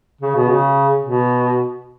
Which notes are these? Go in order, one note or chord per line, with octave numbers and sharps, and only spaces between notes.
C#3
B2
C#3
B2